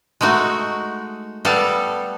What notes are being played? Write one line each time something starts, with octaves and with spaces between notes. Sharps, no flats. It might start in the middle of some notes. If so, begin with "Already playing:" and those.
G#3 A3 D#4 F#4
G3 B3 A4 F5